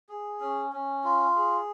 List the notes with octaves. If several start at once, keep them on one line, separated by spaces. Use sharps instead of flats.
G#4
C#4
C#4
F4
G#4